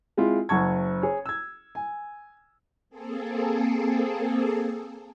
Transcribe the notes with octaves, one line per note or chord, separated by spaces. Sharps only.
G#3 C4 E4 F4
F#1 F#5 A5 C#6 G#6
G#4 C#5
E6 G#6
G#5
A#3 C4 G#4 A4